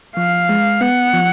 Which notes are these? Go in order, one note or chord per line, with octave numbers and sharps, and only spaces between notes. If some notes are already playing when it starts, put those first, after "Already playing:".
F3 F5
G#3
B3 F#5
F3